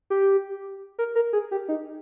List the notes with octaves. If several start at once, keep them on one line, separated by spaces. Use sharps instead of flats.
G4
A#4
A#4
G#4
G4
D#4